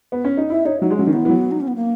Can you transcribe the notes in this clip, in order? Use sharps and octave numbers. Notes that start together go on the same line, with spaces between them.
B3
C#4
D#4
E4 E5
D#4 C#5
F#3 D#4
G#3
F#3 C#4
D#3
E3 B3
E3
F#3
D#4
C#4
B3
A#3